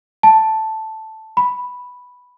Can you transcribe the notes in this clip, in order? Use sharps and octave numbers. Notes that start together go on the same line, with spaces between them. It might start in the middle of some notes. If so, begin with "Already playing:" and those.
A5
B5